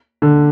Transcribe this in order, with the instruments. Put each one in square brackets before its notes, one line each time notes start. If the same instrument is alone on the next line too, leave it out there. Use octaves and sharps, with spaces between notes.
[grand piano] D3